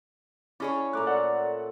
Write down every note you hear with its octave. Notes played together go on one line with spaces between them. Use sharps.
C#4 E4 G#4 C#5 D5
A#2 A3 A#5 D6 F#6
D5 F#5 A#5